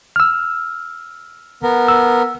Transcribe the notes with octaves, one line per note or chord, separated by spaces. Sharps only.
E6 F6
B3 A#4
E6